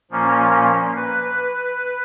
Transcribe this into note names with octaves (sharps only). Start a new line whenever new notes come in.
A#2 F3 A#3 C#4
B4